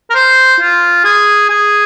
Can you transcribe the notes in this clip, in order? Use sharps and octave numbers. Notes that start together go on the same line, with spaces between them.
A#4
C5
F4
G#4
G#4